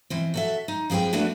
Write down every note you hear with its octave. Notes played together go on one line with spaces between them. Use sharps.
B2 E3 C4
F#4 A4 E5
D#4
F3 C4 G#4 B4 G5
A3 B3 D4 E4 F#4 B4